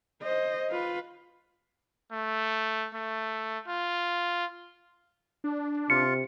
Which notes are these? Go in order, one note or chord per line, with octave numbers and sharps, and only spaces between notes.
C5 D#5
F4 B4
A3
A3
F4
D4
C3 F4 C#7